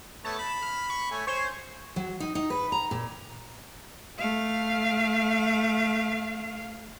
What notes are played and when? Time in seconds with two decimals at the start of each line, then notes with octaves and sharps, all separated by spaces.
0.25 A3 B3 C#5 A5
0.39 B5
0.62 F6
0.90 C#6
1.11 A3 C#5 G#5
1.27 C5 C#5 G#5 C#6
1.96 F#3
2.20 D#4
2.35 D#4
2.50 B4
2.72 A#5
2.91 A#2
4.19 A3 F5